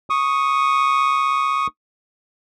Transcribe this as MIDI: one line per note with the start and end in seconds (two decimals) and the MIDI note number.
0.10 1.67 85
0.10 1.67 87